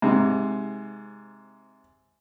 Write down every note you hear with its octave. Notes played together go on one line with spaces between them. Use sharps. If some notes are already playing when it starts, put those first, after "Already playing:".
G#2 C3